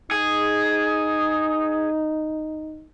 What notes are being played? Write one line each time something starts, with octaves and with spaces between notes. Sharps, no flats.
D#4 G#4